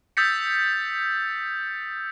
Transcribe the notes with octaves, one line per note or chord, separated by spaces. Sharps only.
D#6 E6 G6 A6 B6 C#7